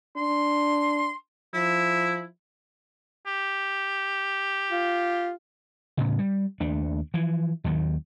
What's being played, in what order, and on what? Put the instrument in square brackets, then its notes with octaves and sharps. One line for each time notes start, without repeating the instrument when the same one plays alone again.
[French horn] D4 [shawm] C6
[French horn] F3 [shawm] E4
[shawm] G4
[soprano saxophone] F4
[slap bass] D2 A2 C#3
G3
D#2 A3 D4
E3 F3
D#2 D#3 F#3